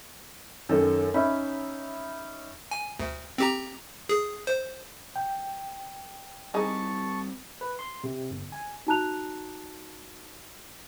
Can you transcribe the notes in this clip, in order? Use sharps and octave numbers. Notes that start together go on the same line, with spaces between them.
F#2 D#3 A4
C#4 D#4 E5 B5
G#5
D2
C4 G4 A#5
G#4
C5
G5
G3 C4 D#4 G#4 A5 C#6
B4
C6
C3
G1
G#5
D#4 F#4 A5 A#5 F#6 F7